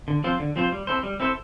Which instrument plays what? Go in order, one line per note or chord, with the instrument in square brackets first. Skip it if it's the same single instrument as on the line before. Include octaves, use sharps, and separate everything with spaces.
[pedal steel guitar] D3
F3 C4 F4 C5
D3
F3 C4 F4 C5
G3
C4 E4 A4 C5
G3
C4 E4 A4 C5